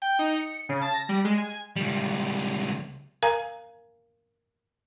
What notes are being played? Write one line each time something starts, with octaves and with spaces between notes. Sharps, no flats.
G5
D#4
C#7
C#3
A5
A#6
G3
G#3
G#5
C#2 G3
A#4 F5 G#5 A#5